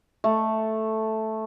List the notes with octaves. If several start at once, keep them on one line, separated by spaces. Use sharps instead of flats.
A3